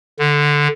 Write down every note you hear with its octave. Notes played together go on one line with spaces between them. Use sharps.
D3